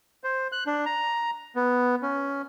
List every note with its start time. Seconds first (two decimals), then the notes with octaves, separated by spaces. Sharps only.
0.24 C5
0.52 F#6
0.67 D4
0.86 A#5
1.56 B3
2.02 C#4